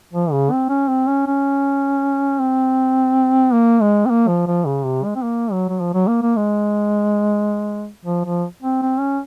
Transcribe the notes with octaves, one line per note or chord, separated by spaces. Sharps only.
F3
C#3
C4
C#4
C4
C#4
C#4
C4
A#3
G#3
C4
A#3
F3
F3
C#3
C3
G#3
C4
A#3
F#3
F#3
F3
F#3
A#3
A#3
G#3
F3
F3
C4
C4
C#4